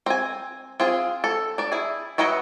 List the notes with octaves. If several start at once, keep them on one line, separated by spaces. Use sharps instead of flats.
C4 G#5
C4 F4 G#4
A4
D4 D5
E4 G#4
F#3 E4 B4 C#5 D#5